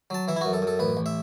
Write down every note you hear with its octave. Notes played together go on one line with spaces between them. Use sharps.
F#3 A5
E3 E5
E4
F#2 F#4
A4
F#2
A4
A1 B4
A1
E5